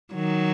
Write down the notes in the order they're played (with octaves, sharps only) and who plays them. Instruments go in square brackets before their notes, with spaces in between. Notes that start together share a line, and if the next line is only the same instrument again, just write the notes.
[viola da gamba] D#3 F#3